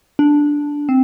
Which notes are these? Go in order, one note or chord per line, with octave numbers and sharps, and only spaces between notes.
D4
C4